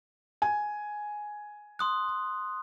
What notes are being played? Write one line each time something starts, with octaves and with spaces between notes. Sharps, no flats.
G#5
C6 D#6 F#6